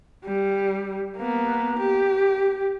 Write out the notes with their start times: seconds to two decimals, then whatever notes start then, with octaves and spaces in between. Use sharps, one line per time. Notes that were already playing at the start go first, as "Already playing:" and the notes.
0.25 G3
1.17 A#3 B3
1.79 G4